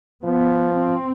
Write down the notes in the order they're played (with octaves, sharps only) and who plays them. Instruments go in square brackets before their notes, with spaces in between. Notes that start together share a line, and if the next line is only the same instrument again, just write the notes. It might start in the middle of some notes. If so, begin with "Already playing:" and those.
[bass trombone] F3 [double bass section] B3
[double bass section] C4